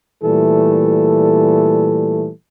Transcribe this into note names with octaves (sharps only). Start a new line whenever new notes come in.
A#2 E3 G3 A3 A4